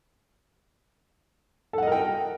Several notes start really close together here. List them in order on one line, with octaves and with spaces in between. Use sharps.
A4 F#5 D#5 A#4 G5